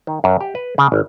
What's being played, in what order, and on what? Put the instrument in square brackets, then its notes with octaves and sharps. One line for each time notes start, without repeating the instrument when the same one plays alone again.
[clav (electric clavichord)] D#3
F#2
G4
B4
C#3
G#1